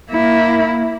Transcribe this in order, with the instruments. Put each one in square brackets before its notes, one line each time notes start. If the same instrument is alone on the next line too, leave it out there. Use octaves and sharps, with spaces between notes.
[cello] A#3 E4